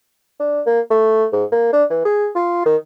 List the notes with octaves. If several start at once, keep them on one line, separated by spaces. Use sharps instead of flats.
D4
A#3
A3
G#2
A#3
D4
E3
G#4
F4
D#3